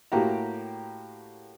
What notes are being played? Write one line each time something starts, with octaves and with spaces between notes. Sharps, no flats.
A2 A#3 F#4 G4 G5 A#5